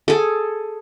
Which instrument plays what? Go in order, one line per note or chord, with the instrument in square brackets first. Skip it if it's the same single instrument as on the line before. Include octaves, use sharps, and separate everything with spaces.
[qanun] G#4 A4